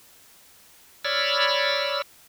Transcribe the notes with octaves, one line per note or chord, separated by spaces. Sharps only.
C#5 D5 B5 E6 F6